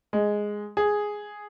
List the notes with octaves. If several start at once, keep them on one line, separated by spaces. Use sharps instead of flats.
G#3
G#4